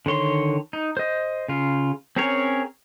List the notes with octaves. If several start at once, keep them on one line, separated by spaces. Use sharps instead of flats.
D3 D#3 C#5 C6
D#4
C5 D#5
C#3 F4
C4 C#4 G#4 A#4 C#5